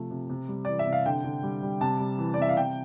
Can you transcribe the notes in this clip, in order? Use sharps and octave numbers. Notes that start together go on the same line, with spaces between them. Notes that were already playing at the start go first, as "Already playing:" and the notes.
Already playing: C3 F3 A3
C3
C3
G3
E3 D5
E5
C3
F5
D3 G5
D3
G3
G3
C3 A5
G3
E3
D5
C3 E5
F5
C3 G5